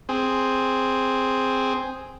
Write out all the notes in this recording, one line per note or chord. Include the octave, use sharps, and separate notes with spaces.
C4 G#4